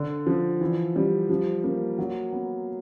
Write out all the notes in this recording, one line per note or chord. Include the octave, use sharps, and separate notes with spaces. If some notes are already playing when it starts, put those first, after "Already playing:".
Already playing: D3
F3
E3
G3
F3
A#3
F#3
B3